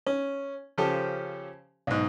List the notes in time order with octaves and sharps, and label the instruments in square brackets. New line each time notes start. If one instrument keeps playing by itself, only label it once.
[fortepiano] C#4
C#3 F3 C#4 G4 A4 C5
B1 G#2